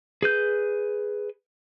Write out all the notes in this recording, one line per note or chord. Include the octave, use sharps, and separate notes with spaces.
G#4 B4 G6